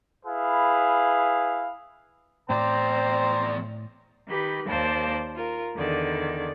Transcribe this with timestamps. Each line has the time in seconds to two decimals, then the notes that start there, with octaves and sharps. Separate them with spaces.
0.25 E4 G#4 B4 F5
2.50 E2 A2 C4 C5 D5 A#5
4.29 D#3 G4 B4 B5
4.67 D#2 A#3 C5 D5 A5
5.35 F4 A#4
5.76 E2 D3 D#3 D5